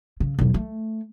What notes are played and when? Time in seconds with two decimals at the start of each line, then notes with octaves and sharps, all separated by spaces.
0.20 C#3
0.39 B1 E2
0.54 A3